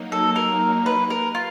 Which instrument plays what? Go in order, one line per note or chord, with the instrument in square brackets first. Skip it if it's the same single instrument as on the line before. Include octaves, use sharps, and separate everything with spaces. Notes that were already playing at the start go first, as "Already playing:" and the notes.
Already playing: [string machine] F#3 A#3 D#4
[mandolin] A4
A#4
B4
A#4
F4